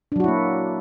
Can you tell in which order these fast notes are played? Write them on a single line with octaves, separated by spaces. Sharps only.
D4 F#3 F#4 E4 A#3